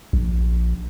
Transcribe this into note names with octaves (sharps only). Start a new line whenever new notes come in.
A#1